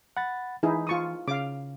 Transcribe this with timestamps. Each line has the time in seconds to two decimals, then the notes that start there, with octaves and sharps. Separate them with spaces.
0.17 F#5 B5 A6
0.63 E3 D#4 E4 G#4
0.87 F4 C#6 D#6
1.28 C#3 F5 D6